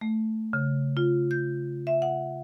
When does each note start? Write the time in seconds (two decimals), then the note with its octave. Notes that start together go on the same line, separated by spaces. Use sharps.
0.01 A3
0.53 C#3
0.97 F4
1.31 G6
1.87 E5
2.02 F#5